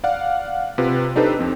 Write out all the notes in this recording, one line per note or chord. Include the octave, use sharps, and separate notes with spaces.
D5 F5 F#5
C3 F4 B4
D4 D#4 G4 A4 B4 C5
F2 C4